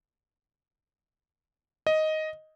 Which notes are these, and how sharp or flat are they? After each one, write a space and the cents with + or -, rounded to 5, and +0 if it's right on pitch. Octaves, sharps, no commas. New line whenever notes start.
D#5 +5